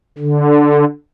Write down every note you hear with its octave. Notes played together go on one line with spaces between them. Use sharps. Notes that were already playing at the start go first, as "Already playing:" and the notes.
D3